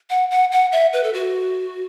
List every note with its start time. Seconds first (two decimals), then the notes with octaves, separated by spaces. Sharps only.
0.10 F#5
0.31 F#5
0.52 F#5
0.72 E5
0.93 B4
1.03 A4
1.13 F#4